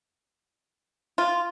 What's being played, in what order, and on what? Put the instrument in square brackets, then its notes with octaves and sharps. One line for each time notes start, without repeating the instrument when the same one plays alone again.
[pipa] F4